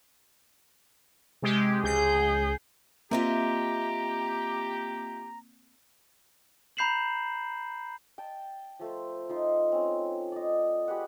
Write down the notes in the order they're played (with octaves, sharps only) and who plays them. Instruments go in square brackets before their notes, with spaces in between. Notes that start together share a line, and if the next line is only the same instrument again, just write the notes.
[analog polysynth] C3 G#3 G4
[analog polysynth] C#2 G6 [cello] G#4
[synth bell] A#3 C4 [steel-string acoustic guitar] F4 D#5 E5 [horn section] G4 [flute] A#5
[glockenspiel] A#5 B5 G6 C7 E7 F#7
[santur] G5 A5
F3 A3 C5
F3 D#4 C6
C4 C#4
D5 D#5
G4 G#4 B4 F#5